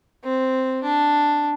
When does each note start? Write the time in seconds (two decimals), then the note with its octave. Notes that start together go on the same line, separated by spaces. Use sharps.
0.24 C4
0.83 D4